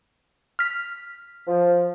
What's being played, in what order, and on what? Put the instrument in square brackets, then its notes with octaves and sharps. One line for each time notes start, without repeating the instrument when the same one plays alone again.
[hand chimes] F6 B6
[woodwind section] F3